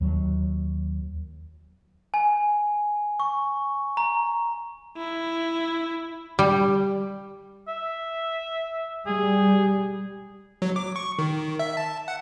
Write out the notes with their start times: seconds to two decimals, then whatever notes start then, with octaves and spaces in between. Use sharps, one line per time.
0.01 D#2 F#3
2.14 G#5
3.20 C#6
3.97 A#5
4.97 E4
6.39 G3
7.68 E5
9.06 G3 G#4
10.62 F#3
10.76 D6
10.96 C#6
11.19 D#3
11.59 E5
11.77 A5
12.08 F#5